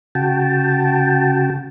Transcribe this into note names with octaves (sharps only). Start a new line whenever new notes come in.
C#3 F#4 G5 A5